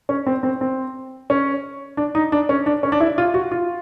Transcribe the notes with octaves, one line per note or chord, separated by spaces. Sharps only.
C#4
C4
C4
C4
C#4
D4
D#4
D4
C#4
D4
C#4
D4
E4
F4
F#4
F4